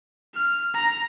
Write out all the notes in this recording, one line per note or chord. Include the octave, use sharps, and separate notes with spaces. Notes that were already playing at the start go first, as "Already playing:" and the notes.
F6
A#5